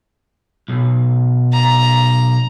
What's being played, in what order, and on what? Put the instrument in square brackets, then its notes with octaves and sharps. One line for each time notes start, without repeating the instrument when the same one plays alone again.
[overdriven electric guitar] B1
[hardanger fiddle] A#5